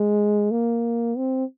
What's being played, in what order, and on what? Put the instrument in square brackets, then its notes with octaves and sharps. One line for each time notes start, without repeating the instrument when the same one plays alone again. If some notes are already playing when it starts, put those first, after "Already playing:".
Already playing: [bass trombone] G#3
A#3
C4